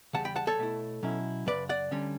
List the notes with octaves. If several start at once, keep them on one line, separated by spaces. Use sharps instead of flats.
E2 C#3 G3 F#5 A5
G5 B5
F#5 A5
A4 C#5
B2 A3 E4
B2 F#3 C#4 E4
F#2 C#3 B4 D5
D5 F#5
D2 D3 G3 C#4